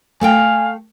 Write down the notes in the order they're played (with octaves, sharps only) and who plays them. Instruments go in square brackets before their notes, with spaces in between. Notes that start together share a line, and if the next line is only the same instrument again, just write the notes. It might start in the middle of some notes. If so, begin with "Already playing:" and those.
[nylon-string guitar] A3 A4 G5 [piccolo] F5 [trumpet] G#5